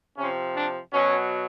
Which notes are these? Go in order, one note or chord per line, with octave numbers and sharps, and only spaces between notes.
C3 F3 C#4
D4
B2 F#3 C#4